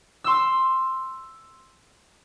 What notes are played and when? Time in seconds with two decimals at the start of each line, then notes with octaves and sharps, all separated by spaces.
0.24 C6 E6